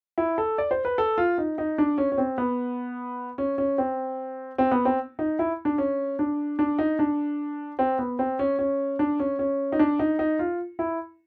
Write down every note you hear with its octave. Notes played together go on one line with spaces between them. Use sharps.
E4
A4
D5
C5
B4
A4
F4
D#4
D#4
D4
C#4
C#4
C4
B3
C#4
C#4
C4
C4
B3
C4
D#4
E4
D4
C#4
D4
D4
D#4
D4
C4
B3
C4
C#4
C#4
D4
C#4
C#4
D#4
D4
D#4
D#4
F4
E4